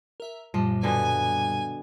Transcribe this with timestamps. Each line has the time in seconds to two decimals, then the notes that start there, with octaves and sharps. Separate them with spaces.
0.20 A#4 E5
0.54 F#2 A#2 F3 G3
0.83 B2 D3 B3 G#5